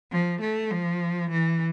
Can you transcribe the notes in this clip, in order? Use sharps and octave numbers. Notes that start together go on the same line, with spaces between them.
F3
A3
F3
E3